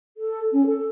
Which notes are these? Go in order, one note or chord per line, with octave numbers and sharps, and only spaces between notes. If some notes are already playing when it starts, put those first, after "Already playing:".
A4
C#4
A4